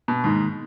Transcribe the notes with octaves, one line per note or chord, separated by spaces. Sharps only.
B2
G#2 D#3 A#3 D#4